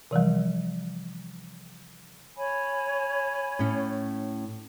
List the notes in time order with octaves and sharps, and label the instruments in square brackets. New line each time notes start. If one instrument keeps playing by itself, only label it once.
[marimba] C3 E3 F3 G3
[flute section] C#5 G#5 B5
[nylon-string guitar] A2 C#4